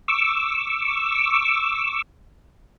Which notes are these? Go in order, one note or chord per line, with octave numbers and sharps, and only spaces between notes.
C#6 D6 E6